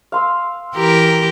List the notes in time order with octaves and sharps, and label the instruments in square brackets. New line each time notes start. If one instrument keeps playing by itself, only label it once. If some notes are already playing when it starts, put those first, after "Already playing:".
[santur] F5 C6 E6
[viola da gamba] E3 G4 A#4